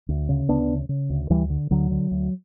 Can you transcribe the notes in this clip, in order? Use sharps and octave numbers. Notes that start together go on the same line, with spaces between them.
D2
C#3
D2 B3 D4
C#3
C#3
D2
D2 E3 G3
D3
D2 D3 F#3
D3
D2